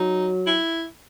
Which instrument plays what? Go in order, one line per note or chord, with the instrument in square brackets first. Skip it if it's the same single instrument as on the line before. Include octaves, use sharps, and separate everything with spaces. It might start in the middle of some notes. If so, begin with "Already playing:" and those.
Already playing: [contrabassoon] F#3 [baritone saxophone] D#4
[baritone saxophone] E4